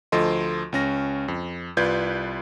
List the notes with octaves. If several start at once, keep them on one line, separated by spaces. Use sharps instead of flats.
D2 F3 A4 D#5 C6
C#2 C#4 A#6
F2
C2 F4 B4 D5 G6 G#6